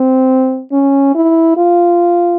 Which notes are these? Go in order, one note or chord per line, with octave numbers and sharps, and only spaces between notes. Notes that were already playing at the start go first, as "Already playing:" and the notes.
Already playing: C4
C#4
E4
F4